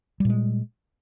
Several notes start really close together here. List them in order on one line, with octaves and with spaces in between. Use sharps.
G3 A#2 G#3